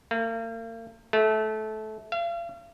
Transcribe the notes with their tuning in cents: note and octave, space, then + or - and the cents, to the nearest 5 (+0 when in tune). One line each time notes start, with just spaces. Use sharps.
A#3 -40
A3 -20
F5 -40